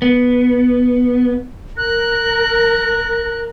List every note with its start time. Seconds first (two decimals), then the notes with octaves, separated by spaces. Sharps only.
0.02 B3
1.77 A#4 F#6